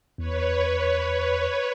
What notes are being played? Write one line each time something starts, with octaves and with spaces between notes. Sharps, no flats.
E2 B4 C#5